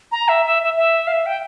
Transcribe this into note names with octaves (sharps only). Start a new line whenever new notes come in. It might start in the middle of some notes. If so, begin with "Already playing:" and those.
A#5
E5
E5
E5
E5
F5
E5
G5